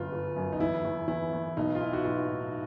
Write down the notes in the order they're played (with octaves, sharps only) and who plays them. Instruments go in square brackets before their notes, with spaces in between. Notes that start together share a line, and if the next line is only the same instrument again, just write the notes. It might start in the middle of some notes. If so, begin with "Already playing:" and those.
Already playing: [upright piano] G1 F#2 [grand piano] F4
[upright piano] G1
F#2
[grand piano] D#4
[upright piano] E2 [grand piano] E4
[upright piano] E2
[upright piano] E2 [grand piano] E4
[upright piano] E2
[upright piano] B1 [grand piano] D#4
[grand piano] F4
[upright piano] E3 [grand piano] E4
[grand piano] F#4
[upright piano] B1 [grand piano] F4
[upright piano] A2